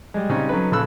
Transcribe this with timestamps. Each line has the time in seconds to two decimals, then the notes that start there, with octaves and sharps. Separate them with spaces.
0.14 G3 G#3
0.30 C#3 G3 C4 C#4 D#4
0.49 F#3 C#4 D#4 A4 B4
0.71 A#1 C#3 A4 B5 E6 F#6